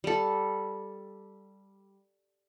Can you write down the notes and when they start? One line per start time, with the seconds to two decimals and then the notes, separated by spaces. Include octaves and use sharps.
0.04 G3 A4